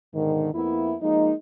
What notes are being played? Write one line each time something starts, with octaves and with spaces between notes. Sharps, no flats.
G#2 B2 D3 D#3
F2 A#3 B3 E4
F3 G#3 A#3 D#4